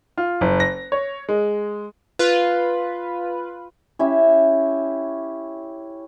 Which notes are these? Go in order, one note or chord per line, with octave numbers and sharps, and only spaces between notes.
F4
F#1
A#6
C#5
G#3
F4 B4
C#4 E4 G4 E5